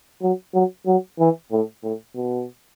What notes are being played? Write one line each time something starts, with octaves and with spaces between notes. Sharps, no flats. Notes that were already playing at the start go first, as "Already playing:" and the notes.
F#3
F#3
F#3
E3
A2
A2
B2